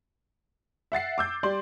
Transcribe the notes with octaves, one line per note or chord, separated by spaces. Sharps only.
E5 F#5 A6 C7
D6 E6 G6
G3 D5 C6 F#7